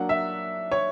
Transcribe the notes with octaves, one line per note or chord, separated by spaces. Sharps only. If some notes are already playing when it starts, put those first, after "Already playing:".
Already playing: F#3 A#3 D4 F#5
E5
C#5